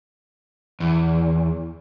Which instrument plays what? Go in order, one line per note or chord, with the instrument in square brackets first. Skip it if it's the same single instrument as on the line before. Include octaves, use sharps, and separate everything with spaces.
[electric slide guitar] E2